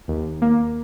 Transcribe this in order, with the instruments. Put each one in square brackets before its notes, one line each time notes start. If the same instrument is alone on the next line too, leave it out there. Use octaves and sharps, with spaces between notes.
[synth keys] D#2
A#3